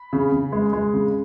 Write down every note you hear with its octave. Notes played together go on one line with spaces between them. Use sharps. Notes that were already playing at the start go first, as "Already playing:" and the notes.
Already playing: B5
C#3
C#3
G#3
G#3
C#3